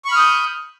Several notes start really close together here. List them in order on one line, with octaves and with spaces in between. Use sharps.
C#6 B5 F6 D#6 G6